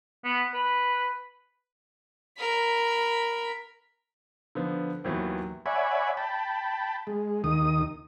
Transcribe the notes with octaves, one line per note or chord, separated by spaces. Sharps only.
B3
B4
A#4 B5
D3 F3 B3
D#2 E3 F#3 B3
C#5 D5 E5 F#5 G#5 B5
G5 A5 B5
G#3
D#2 D#3 D#6